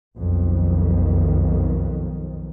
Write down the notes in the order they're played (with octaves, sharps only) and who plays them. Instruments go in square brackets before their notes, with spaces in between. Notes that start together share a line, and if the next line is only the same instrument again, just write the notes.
[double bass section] B1 F2 D#3